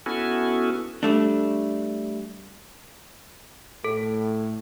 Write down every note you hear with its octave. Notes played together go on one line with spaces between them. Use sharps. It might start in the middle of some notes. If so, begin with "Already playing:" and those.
B3 C#4 E4 F#4 A4 G#5
G3 A3 D4
A2 A4